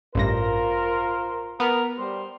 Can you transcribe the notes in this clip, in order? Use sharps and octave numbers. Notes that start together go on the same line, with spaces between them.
A1 G2 F4 A#4 C5 A#6
B3 A#4
G3 C5